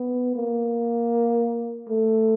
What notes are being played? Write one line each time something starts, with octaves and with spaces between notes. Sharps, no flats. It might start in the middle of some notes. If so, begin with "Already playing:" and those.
Already playing: B3
A#3
A3